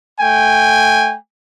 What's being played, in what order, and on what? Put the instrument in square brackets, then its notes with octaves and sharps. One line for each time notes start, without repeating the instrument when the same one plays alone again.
[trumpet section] A3 G5 G#5